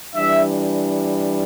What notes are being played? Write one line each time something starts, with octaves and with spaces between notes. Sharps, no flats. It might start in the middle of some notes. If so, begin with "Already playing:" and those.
E3 G3 D4 E5